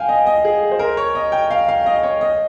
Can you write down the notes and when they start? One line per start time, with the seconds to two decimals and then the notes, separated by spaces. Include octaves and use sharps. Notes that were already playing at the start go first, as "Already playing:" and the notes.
Already playing: F5 G5 G#5
0.09 D#5
0.26 D#5
0.45 G#4
0.72 C5
0.79 A#4
0.97 C#5
1.15 D#5
1.32 G5
1.51 F5
1.68 F5
1.86 D#5
2.03 C#5
2.21 D#5